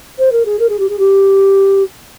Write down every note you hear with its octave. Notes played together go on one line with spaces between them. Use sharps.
C5
A#4
G#4
A#4
G#4
G4
G#4
G4